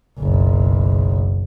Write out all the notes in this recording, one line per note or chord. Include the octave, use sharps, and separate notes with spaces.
F#1 B1